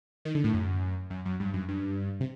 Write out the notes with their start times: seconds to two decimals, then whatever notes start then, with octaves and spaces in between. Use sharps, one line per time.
0.25 D#3
0.35 D3
0.44 A2
0.54 F#2
1.10 F#2
1.25 F#2
1.40 G2
1.54 F#2
1.69 G2
2.20 C3